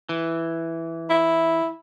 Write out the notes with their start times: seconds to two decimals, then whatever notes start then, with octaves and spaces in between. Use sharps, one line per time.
0.09 E3
1.09 E4